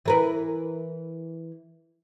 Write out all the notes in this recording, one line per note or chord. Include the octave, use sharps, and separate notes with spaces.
E3 A#4 B4